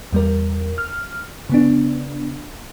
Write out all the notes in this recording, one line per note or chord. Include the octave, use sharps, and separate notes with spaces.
E2 G3 A#4
F6
C#3 B3 D4